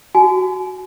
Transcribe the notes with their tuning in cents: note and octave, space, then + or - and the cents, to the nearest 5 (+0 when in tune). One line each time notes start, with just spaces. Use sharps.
F#4 +5 G#5 +40